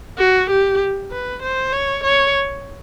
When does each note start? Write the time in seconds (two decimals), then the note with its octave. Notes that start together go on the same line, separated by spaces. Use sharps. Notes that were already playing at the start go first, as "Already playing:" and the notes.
0.18 F#4
0.50 G4
1.11 B4
1.42 C5
1.73 C#5
2.04 C#5